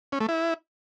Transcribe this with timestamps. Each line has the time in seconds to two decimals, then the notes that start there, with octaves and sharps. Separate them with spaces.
0.12 C#4
0.20 A3
0.29 E4